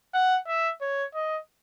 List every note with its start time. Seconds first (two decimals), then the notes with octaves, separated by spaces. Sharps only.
0.14 F#5
0.47 E5
0.81 C#5
1.14 D#5